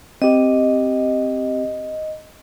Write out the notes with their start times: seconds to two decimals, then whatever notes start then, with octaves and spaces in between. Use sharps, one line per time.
0.22 C4 G4 D#5